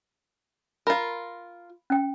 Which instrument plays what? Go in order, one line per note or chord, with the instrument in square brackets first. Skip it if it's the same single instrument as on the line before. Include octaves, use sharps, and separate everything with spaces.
[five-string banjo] F4 A#4 [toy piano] B5
[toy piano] C#4 G5